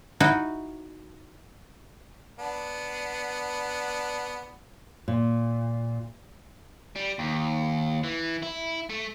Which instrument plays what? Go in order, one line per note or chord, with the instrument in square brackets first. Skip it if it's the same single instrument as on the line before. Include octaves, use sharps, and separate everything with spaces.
[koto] D#4 E4 F#4
[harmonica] B3 D4
[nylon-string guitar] A#2
[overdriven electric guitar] G3
D#2
E3
E4
A3